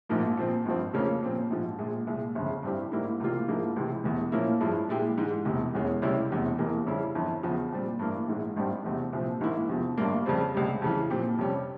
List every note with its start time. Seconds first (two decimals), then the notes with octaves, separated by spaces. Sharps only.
0.09 A#1 G#2 F3 A#3
0.37 A#2 F3 C4
0.65 G#1 G2 F3 C4
0.94 F2 C#3 F3 A#3 C#4
1.22 A#2 F3 C4
1.50 A#1 G#2 F3
1.79 A#1 A#2 G#3
2.07 C2 A#2 G#3
2.35 G1 F2 C#3
2.63 G2 G3 C4 E4 G4
2.92 G#2 G3 A#3 E4
3.20 C#2 C3 E3 A#3 F4
3.48 G#2 F3 A#3 E4 G#4
3.76 C#2 C3 E3
4.04 E1 E2 E3
4.32 A#2 F3 A#3 C#4 E4
4.61 G2 F3 G#3 E4
4.89 A#2 G#3 E4 G4
5.18 G#2 E3 G#3
5.45 E1 E2 C3
5.74 E1 E2 E3 G#3 C#4
6.02 C#2 C3 G3 C#4 E4
6.30 E1 E2 C3
6.58 F1 E2 C3 E3 A#3
6.86 F2 C#3 G3 C#4 E4
7.15 G1 F2 E3
7.43 E2 C#3 F3
7.71 A#2 G3 C4 G4
7.99 G2 E3 A#3 E4
8.28 A#1 G#2 E3 G#3
8.56 G#1 G2 G3 C4 G4
8.84 F1 E2 C3
9.13 C2 A#2 F3 C4
9.41 G#1 G#2 E3 A#3 E4
9.69 E2 C3 F3
9.97 G1 G2 G3 A#3
10.25 F2 C#3 G3 C4
10.54 C#2 C3 G3
10.82 F2 C#3 E3
11.10 A#2 F3 C4 G4
11.38 F2 C3 G3 C#4 G4